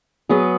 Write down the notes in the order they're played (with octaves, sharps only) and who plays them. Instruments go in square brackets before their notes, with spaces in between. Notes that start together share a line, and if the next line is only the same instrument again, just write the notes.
[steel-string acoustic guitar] F#3 B3 G#4